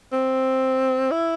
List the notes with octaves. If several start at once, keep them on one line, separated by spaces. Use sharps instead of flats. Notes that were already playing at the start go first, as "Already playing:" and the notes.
C4
E4